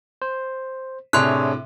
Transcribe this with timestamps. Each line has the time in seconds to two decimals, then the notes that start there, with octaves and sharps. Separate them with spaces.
0.22 C5
1.13 A2 C3 D4 G#4 C#5 C6 F#6